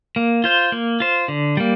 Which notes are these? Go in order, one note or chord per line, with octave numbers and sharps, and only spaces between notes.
A#3
F4 C5
A#3
F4 C5
D3
G3 A#3